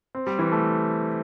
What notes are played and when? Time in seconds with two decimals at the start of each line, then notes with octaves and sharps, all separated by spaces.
0.15 C4
0.27 G3
0.39 E3
0.52 A3